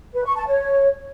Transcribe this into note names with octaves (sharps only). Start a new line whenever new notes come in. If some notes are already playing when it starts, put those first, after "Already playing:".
B4
C#6
A5
C#5